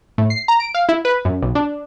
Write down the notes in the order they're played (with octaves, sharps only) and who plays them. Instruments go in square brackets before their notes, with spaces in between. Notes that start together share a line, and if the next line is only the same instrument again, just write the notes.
[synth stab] A2
C7
A#5
D7
F5
E4
B4
F#2
B1
D4